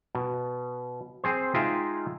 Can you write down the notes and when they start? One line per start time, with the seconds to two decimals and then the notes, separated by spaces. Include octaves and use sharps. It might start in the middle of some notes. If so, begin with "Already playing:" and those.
0.15 B2
1.24 C4 G#4 C5
1.54 G#3 D#4 F4 G#4 E5 G5